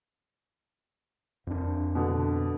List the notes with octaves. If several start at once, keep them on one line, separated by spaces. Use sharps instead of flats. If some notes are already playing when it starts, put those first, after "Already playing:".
F2 D4
B2 D3